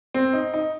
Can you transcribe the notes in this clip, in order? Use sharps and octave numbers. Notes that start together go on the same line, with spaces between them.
C4
D#4
D#4